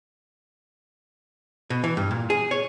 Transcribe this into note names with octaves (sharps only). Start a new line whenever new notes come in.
B2
E3
G2
A#2
G#4
C#5